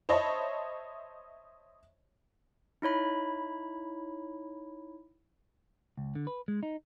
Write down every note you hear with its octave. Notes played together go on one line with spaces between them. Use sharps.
C5 C#5 D#5 E5 A5 B5
D#4 E4 C#5 B5
C#2
D3
B4
G#3
D#4